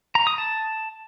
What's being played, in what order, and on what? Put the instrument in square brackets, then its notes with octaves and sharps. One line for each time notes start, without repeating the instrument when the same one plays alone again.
[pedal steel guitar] A#5
D#6
A5